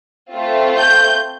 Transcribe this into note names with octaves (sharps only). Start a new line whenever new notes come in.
A3 C4 F4
G6